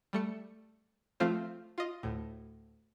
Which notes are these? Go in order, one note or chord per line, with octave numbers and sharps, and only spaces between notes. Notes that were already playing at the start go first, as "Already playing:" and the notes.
G3 A3 C#7
F3 A3 C4 F4 C5
F4 D#5
D2 A2